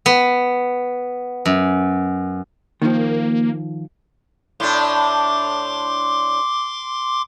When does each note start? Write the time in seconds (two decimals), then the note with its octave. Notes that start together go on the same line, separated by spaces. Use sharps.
0.06 B3
1.45 F#2
2.82 D#3 F3 A#3
4.60 A2 D4 C6 D6